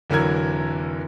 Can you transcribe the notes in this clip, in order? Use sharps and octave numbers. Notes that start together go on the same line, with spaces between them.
F1 D3 E3 F#3 A#4 G#6